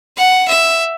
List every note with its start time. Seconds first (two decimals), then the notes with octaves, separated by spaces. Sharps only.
0.17 F#5
0.48 E5